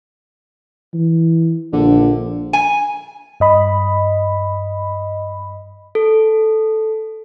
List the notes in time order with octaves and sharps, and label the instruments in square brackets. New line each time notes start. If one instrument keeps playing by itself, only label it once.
[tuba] E3
[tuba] A#1 [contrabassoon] D3
[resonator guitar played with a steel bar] G#5
[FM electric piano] G2 D#5 B5
[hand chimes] A4